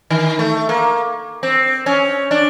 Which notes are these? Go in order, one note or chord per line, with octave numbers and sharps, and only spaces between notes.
D#3
A3
A#3
C4
C#4
D4